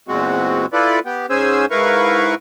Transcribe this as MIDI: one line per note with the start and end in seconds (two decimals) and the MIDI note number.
0.08 0.66 40
0.08 0.66 46
0.08 0.66 56
0.08 0.66 60
0.08 0.66 66
0.73 0.99 64
0.73 0.99 65
0.73 0.99 69
0.73 0.99 71
0.73 0.99 74
1.05 1.26 59
1.05 1.26 67
1.30 1.66 44
1.30 1.66 61
1.30 1.66 68
1.30 1.66 72
1.30 1.66 80
1.30 1.66 88
1.71 2.35 44
1.71 2.35 64
1.71 2.35 70
1.71 2.35 71
1.71 2.35 77
1.71 2.35 85